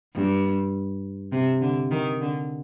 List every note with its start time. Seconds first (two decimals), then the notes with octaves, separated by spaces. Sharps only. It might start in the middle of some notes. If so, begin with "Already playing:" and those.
0.14 G2
1.32 C3
1.61 D3
1.91 D#3
2.21 D3